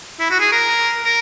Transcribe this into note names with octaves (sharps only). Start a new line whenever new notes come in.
E4
F#4
G#4
A#4
A#4